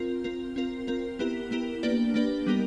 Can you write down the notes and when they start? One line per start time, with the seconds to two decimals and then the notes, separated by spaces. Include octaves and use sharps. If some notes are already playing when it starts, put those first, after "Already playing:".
Already playing: C4 F4 A#4
0.24 C4 F4 A#4
0.56 C4 F4 A#4
0.87 C4 F4 A#4
1.19 B3 E4 G4 A#4
1.51 B3 E4 G4 A#4
1.83 A#3 D4 G4 B4 D5
2.14 A#3 D4 G4 B4 D5
2.46 G3 B3 D#4 G4 A#4